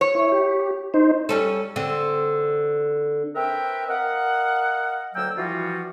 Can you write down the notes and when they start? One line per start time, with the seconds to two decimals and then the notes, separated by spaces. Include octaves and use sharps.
0.01 C#5
0.15 E4
0.32 G4
0.94 D#4 C5
1.29 G3 C#4 A4
1.76 D3 C4
3.35 C4 A#4 B4 E5 G5
3.88 A#4 D#5 F5 F#5
5.15 D2 F#3 A#3 G5 E6
5.37 E3 F3 G3 F4 F#4